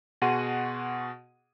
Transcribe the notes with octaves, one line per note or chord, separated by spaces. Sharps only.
B2 F#4 G#4 F#5 C6 D#7